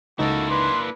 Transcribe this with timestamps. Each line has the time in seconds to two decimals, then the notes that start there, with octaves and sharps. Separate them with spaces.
0.19 C#2 A#3 D#4 E4 F#4 A4
0.50 D4 B4 C6